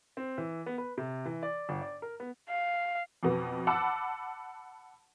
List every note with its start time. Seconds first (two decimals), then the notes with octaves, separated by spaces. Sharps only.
0.17 C4
0.38 E3
0.66 B3
0.78 B4
0.98 C3
1.26 E3
1.43 D5
1.69 G1
1.81 D5
2.02 A#4
2.20 B3
2.49 F5
3.23 F2 B2 B3
3.67 F#5 A5 B5 D6 E6